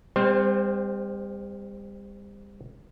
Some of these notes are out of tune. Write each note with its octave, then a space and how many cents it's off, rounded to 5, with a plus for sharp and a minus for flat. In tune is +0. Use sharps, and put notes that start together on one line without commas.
G3 +35 C4 -20 C5 +10